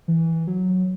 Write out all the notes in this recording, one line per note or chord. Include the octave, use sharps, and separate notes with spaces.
E3
F#3